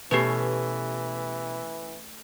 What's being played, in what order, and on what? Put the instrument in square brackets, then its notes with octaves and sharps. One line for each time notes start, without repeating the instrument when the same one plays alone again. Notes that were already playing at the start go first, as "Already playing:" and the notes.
[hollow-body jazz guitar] B2 [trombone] E3 [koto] A3 C#4 [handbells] G4 B4